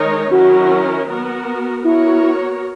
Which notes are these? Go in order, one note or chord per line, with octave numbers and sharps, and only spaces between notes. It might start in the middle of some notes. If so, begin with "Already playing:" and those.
Already playing: D#3 G#3 D#4 A#4 C#5
D#3 F#3 C#4 E4 F#4 A#4
B3 F#4 A#4
B3 E4 F#4 A#4 C#5